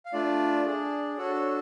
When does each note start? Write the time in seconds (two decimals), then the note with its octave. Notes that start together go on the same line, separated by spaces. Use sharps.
0.05 F5
0.13 A3 D4 F4 D5
0.66 D4 G#4
1.17 D4 F#4 A4 C#5
1.35 C#5